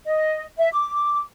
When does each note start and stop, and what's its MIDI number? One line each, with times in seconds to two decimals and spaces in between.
0.06 0.44 75
0.59 0.69 76
0.73 1.21 86